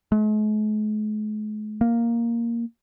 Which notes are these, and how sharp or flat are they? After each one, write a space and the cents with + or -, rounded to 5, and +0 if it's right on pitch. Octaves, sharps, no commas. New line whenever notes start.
G#3 +45
A#3 +0